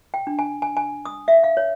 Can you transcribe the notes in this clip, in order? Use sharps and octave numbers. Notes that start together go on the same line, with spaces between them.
G5
D4
G#5
G#5
G#5
D#6
E5
F5
C#5